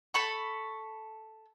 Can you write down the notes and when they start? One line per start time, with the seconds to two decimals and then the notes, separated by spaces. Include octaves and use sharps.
0.14 A4 B5 C#6